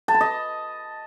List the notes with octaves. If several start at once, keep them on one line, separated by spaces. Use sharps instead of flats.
A5
B5
D#5